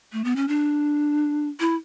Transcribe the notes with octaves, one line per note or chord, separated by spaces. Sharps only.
A3
B3
C#4
D4
E4